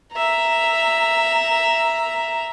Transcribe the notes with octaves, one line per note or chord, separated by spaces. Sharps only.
E5 A#5